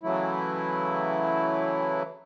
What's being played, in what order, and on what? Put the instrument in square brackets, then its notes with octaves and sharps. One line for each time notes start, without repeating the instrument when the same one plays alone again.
[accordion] C#3 E3 F#3 A3 E4